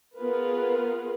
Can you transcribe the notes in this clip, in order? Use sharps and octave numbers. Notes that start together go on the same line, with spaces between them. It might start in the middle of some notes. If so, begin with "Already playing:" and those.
B3 F4 G#4 A#4 B4